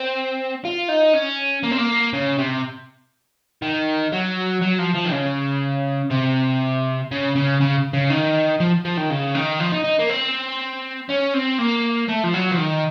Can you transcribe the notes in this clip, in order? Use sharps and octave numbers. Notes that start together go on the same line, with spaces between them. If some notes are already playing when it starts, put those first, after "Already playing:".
Already playing: C4
F4
D#4
C#4
A#3
C4
A#3
C#3
C3
D#3
F#3
F#3
F3
F3
D#3
C#3
C3
C#3
C#3
C#3
C#3
D#3
F3
F3
D#3
C#3
D#3
F3
D#4
D#4
A#3
C4
C#4
C4
A#3
A3
F3
F#3
F3
D#3